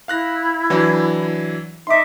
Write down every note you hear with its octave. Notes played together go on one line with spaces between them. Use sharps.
E4 F5 F#6 A#6
E3 F#3 D4
D#4 E5 C6 D6